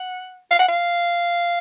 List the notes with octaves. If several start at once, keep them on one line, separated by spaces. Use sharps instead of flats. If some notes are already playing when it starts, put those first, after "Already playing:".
Already playing: F#5
F5
F#5
F5